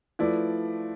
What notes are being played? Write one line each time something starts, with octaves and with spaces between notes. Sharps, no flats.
F3 A3 E4 B4 D5